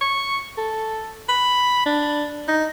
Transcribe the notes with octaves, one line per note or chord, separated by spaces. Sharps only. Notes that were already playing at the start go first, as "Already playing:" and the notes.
C#6
A4
B5
D4
D#4